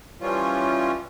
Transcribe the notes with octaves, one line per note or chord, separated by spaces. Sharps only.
E3 F3 G3 C#4 F4